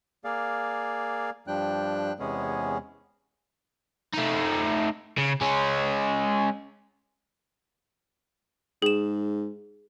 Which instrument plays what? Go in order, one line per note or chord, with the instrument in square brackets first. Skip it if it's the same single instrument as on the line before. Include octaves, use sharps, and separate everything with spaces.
[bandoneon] A#3 G#4 D5 F5
G2 F3 G3 D4 G5 F#6
E2 C3 G#3 B3 C#4 G#4
[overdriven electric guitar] A3 D#4
C#3
G#3 C#4
[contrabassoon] G#2 [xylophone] G#4 E7